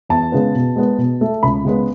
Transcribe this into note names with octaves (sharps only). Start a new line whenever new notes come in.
E2 A5
C#3 G#3 B3
B2
G#3 B3
B2
A3
C#2 B5
C#3 G#3 B3